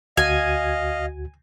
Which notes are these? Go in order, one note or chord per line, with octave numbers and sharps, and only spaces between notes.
D2 F#4 D#5 F5 G#5 G#6